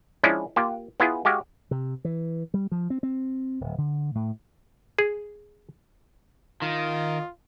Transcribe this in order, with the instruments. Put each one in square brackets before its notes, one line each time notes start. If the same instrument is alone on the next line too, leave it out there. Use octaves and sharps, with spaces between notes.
[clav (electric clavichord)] F3 G#3 C#4 D4 E4
A#3 F4 G4
B3 E4 F4 G#4
G#3 F#4 G4 F5
[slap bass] C3
E3
G3
F3
C4
C4
D1
D3
A2
[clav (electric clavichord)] G#4
[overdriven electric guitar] D#3 [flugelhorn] F4